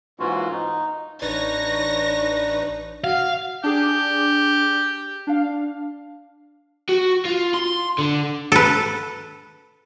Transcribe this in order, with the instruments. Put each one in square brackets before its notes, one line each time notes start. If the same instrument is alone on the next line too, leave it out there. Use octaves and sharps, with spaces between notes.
[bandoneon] G#2 E3 A#3 C#4 F4 F#4
D#4
[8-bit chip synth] A1 D#4 B4 [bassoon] D4 [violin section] C#5 C#6 A#6
[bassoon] F#4 [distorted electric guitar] F5
[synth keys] D4 G#4 D6 [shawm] G4
[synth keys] D4 F5
[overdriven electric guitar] F#4
F4
C6
D3
[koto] A4 B4